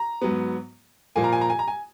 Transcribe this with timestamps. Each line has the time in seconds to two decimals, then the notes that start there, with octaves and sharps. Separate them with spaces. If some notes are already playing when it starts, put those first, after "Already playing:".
Already playing: A#5
0.21 G#2 F#3 B3
1.16 A#2 F3 A#3 G#5
1.24 A#5
1.33 G#5
1.41 A#5
1.50 G#5
1.59 A#5
1.68 G#5